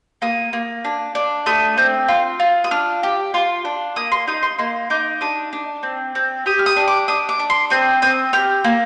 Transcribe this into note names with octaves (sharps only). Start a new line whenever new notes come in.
A#3 D#6
A#3
D4
D4
A3 D#6
C4
F4
F4
D#6
D4 F6
G4
F4
D4
A#3 D#6
C6
D#4 D#6
C6
A#3 C6
D#4 D6
D4 D#6
D4
C4
C4
G4 D#6
F6
D#6
D4
D6
D4 D#6
D6
D4
C6
C4 D#6
C4 D#6
G4 F6
A#3